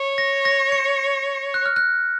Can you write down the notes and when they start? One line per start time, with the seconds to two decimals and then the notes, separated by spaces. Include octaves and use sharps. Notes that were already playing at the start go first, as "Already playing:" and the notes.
Already playing: C#5
0.18 A#6
0.45 A#6
0.72 C#7
1.54 F#6
1.66 F6
1.76 F#6